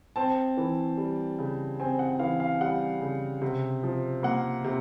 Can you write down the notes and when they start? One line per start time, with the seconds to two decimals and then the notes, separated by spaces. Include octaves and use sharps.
0.16 C4 A5
0.57 E3
0.97 G3
1.39 C#3
1.80 C4 G#5
1.99 F#5
2.19 E3 F5
2.40 F5
2.61 G3 F#5
3.01 C#3
3.42 C3
3.83 F3
4.23 A#3 F#5
4.64 C3